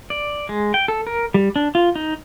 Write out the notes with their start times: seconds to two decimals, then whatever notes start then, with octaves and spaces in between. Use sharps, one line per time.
0.10 D5
0.49 G#3
0.74 G5
0.88 A4
1.07 A#4
1.34 G3
1.56 D4
1.75 F4
1.95 D#4